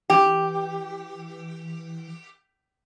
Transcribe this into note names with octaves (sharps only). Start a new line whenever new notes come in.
E3 G4